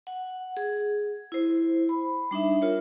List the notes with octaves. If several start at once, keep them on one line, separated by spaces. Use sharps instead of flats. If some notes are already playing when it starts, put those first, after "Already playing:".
F#5
G#4
E4 C5
B5
G3 D4 D#4 E5
F4 A#4 C#5